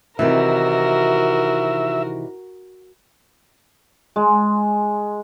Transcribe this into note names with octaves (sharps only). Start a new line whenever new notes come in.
C3 D#3 E3 F#4 A#4 E5
G#3